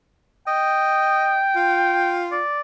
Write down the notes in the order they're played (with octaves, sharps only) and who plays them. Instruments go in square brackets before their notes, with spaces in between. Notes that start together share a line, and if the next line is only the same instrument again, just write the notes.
[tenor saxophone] D#5 [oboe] G5
[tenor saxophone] F4
[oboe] D5